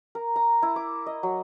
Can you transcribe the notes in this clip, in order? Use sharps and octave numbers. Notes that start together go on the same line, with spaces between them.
A#4
A#5
E4
D6
D#5
F#3